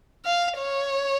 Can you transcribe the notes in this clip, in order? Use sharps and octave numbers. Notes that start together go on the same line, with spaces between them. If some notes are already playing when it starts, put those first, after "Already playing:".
F5
C#5